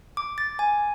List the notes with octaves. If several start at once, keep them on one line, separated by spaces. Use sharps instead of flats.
D6
A6
G#5